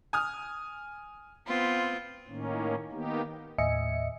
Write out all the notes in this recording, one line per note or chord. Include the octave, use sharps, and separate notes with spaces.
G#5 D#6 F6
B3 C4 F4
A2 D#3 A#3 C#4
D#3 A#3 B3 D#4 G4
D#2 A2 D#5 E5 G#5 C#7